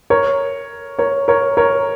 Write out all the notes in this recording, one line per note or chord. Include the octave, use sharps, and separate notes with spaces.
A#4 C#5
A#4 C#5
A#4 C#5
A#4 C#5